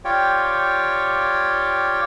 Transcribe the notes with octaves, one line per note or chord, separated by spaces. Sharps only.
F4 G4 C#5 D5 G5